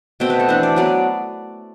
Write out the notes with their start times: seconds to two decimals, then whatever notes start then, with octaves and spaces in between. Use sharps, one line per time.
0.20 B2 A3 C4 G5
0.30 B4
0.40 A4
0.48 E3 A3 D4 C5
0.63 D5
0.76 F#3 B3 D4 D5